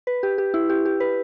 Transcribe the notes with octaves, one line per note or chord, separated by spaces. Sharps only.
B4
G4
G4
E4
G4
G4
B4